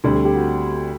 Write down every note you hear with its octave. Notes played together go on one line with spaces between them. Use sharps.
D2 D3 G3 C4 A4
A4
G4
F#4